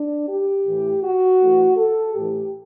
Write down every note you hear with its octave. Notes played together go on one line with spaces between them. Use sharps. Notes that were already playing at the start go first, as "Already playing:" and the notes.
Already playing: D4
G4
A2 E3
F#4
A2 E3
A4
A2 E3 G4